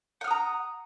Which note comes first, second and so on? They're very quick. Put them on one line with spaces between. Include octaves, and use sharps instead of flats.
F#5 F6 D#6 A#5